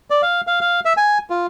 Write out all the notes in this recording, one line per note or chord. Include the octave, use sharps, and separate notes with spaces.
D5
F5
F5
F5
E5
G#5
F4